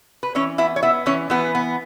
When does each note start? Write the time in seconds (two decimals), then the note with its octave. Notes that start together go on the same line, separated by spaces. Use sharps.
0.23 B4
0.35 E3 C#4 C#5
0.58 B3 E4 E5
0.76 C#5
0.83 B3 E4 E5
1.06 E3 C#4 C#5
1.30 E3 B3 B4
1.55 B3